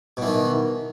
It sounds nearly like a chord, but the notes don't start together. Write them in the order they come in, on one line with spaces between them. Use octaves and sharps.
B2 E3 D#3